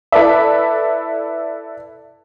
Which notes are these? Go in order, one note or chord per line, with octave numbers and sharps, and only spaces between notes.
E4 A4 B4 D5 E5